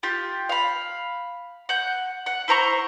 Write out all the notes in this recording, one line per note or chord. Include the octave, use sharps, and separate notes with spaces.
F4 G4
F5 B5
F#5 G6
F#5
E4 C5 A#5 C#6